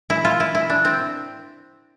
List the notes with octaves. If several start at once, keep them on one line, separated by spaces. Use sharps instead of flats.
E4
F4
E4
E4
D4
C4